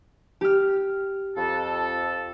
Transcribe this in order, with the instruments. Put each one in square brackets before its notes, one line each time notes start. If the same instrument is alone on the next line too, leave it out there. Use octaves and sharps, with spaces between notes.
[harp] G4 F6
[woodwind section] F2 A4